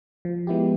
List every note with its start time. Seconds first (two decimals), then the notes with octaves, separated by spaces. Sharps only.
0.25 F3
0.47 G#3 B3 E4 G4